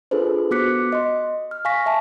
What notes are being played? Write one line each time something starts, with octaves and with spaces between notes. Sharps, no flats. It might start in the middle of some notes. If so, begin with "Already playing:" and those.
D4 F4 G#4 A4 B4 C5
B3 F#4 D6 F#6 B6 C#7
D#5 C6
F6
F5 G#5 C#6 A#6 B6
E5 G#5 A5